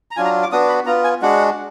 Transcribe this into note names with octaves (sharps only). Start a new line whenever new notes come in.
A#5
F#3 D4 F4 G#5
A#5
D6
B3 D4 F#4 D#6
B5
B3 F4 A#5
G#5
G#3 D4 F#4 F#5